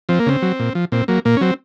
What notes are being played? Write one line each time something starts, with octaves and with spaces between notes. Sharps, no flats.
F3 C4
A#3
C#3 C4
F#3
A#2
F3
A#2 C4
F#3 A#3
A#2 A#3
C#4
F#3 C4